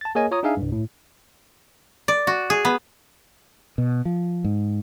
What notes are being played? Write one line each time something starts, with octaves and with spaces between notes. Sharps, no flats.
A5 A6
A#3 G#4 A#4 C#5 D#5 G#5
F4 C#5 A#5 D#6
D4 D#4 G#4 E5 F5 G#5
C2 G2
A2
D5
F#4
G#4
B3
B2
F3
G#2